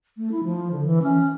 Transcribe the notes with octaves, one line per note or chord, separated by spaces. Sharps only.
A3
E4
F3
D3
E3
C#4